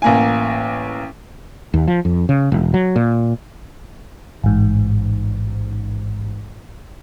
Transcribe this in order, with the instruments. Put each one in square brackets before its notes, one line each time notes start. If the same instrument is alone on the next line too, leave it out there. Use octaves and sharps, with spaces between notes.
[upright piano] A1 A#3 G#5
[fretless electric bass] D#2
F3
F2
C#3
E1
F#3
A#2
[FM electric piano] A1 G#2